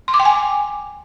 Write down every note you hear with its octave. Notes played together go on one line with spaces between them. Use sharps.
C6
D6
G5
G#5